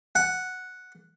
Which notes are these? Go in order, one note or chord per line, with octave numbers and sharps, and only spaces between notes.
F#5